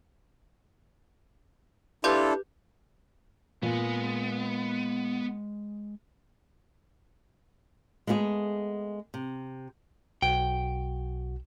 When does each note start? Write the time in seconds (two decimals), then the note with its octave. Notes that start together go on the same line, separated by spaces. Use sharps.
2.04 D4 E4 F4 G4 A4 B4 G6
3.63 A#2 G#3 B3 G#5
8.07 G#3 A3 B3 G4 G#4
9.14 C3
10.22 B1 F#4 G5